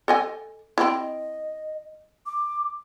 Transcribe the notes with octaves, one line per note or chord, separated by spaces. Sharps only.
A4 D#5 G#5
C4 E4 D#5
D6